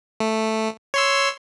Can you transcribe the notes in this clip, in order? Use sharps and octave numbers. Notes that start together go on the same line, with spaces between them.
A3
C#5 C6 E6